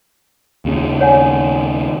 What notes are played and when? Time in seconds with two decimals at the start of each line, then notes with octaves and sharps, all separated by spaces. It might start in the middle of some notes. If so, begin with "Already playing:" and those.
0.65 D#2 C#3
1.01 C#5 F#5 G#5